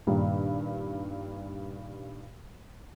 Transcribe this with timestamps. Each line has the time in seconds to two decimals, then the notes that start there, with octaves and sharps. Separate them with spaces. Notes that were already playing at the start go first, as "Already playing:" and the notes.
0.07 G2 A#2 D#3 G3 D#4